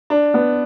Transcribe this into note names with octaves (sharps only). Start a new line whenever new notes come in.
D4
B3